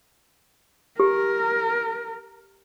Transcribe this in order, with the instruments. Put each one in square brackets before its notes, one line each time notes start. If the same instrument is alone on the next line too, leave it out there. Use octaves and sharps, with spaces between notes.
[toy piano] G4 [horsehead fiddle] A#4